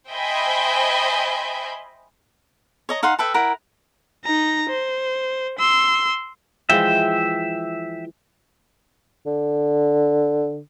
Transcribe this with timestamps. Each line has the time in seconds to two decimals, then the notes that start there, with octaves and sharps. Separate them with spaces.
0.12 C5 D#5 E5 G5 G#5 B5
2.89 C#5 D#5 A#5
3.03 D#4 F5 F#5 C6
3.19 A4 B4 E5 G5
3.34 E4 A#4 F#5 A#5
4.25 D#4 A#5
4.69 C5
5.59 C6 E6
6.69 E3 F3 G#3 E5 G5
9.26 D3